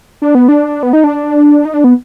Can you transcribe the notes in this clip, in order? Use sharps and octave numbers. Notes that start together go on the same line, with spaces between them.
D4
B3
D4
B3
D#4
D4
D#4
D4
B3